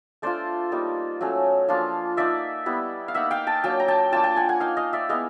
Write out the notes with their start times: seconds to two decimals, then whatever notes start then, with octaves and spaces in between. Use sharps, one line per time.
0.22 A3 D4 F4 C5 D5
0.72 G3 A#3 D#4
1.21 F#3 A3 C#4
1.68 F3 A#3 D4 F4
2.17 A#3 D#4 D5 E5
2.66 G3 B3 E4
3.08 F5
3.14 A#3 D#4 E5 F#5
3.31 F5 G5
3.47 G5 A5
3.64 F#3 A#3 D4 G5 A5
3.80 A#5
3.88 G5 A5
4.12 A#3 D4 F4 G5 A5
4.24 G5 A5
4.36 F#5 G#5
4.49 F#5 G#5
4.60 A#3 D#4 F5 G5
4.77 D#5 F5
4.93 D5 E5
5.09 G#3 B3 E4 D#5 F5